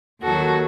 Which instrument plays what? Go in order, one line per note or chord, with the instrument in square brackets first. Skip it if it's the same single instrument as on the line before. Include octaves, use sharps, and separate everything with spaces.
[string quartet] D#2 D#3 F#3 F#4 A4